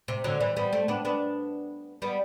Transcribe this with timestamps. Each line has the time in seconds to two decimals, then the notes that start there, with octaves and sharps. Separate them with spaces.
0.08 C3
0.24 D3 F#3
0.40 E3 G3
0.57 G3 B3
0.73 A3 C4
0.88 B3 D4
1.05 B3 D4
2.02 G3 B3